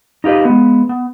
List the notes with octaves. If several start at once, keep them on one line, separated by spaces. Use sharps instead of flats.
D#4 F4 G4 B4 D#5
G#3 B3
B3